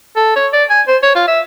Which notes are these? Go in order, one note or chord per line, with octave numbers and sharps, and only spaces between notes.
A4
C#5
D5
G#5
C5
C#5
F4
E5